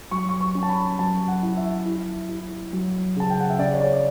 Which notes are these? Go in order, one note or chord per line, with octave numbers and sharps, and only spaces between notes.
F#3 C#6
C#6
C#6
C#4
A5
B5
F#3 A5
F#5
E4
E5
E4
E4
F#3
C#3 A5
G5
F#5
E5
C#3 D5
C#5
D5
D5